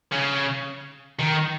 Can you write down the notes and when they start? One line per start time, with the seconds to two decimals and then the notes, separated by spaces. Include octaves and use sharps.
0.12 C#3
1.19 D#3